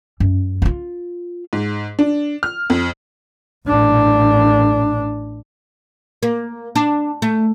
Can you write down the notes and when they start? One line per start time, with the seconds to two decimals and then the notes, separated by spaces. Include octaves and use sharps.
0.20 F#2
0.62 E4 F4
1.53 G#2
1.99 D4
2.43 F6
2.70 F2
3.67 A1 D4
6.23 A#3
6.75 D4
7.22 A3